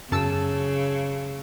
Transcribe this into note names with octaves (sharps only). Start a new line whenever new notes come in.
F#2 C#3 A5 E6